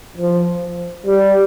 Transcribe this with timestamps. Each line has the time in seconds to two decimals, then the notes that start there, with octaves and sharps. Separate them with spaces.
0.17 F3
1.06 G3